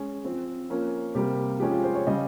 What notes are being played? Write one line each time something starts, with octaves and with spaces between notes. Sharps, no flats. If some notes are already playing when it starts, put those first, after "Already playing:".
Already playing: G#3 C#4
F3 C4
F3 A#3 C#4
C3 G3 A#3 G4
F3 G#3 C#4 G4
F4
C5
C#5
C#3 G3 C#4 D#5